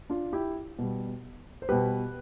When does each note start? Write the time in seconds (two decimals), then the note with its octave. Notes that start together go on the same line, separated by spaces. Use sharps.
0.10 D4 F4
0.33 E4 G4
0.79 B2 G3
1.62 C5
1.69 B2 G3 G4 B4